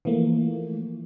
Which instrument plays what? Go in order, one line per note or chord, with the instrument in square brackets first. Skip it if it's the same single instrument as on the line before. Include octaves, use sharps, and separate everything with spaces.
[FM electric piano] E3 F3 A3 A#3